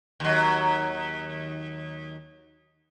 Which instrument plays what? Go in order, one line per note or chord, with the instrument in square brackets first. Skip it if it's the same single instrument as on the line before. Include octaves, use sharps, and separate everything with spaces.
[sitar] D#2 F#3